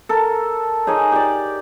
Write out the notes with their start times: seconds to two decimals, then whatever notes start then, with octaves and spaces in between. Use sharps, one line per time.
0.09 A4 A#4
0.87 D#4 G#4 C#5 D#5
1.12 G4 D5